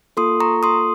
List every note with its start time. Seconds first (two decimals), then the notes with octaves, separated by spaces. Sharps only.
0.17 A#3 F4 A4 C6 D#6
0.40 A#5 C#6
0.63 C6 D#6